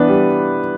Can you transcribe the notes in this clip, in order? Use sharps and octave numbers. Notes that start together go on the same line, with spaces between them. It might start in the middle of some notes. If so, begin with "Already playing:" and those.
Already playing: E3 B3 D4 B4
G3